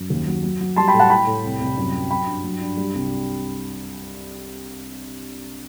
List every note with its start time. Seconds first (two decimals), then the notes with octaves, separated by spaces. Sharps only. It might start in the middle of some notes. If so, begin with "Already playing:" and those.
Already playing: F#2
0.10 D#2
0.27 F#3
0.43 F#3
0.60 F#3
0.76 G3 A5 C6
0.88 G5 B5
0.94 A2
0.99 F#5 A5
1.10 A2 G5 B5
1.27 A2
1.44 C2
1.60 C2
1.78 F#2
1.93 F#3
2.10 F#3 G5 B5
2.27 G2
2.44 F#3
2.61 G2
2.77 G3
2.94 C2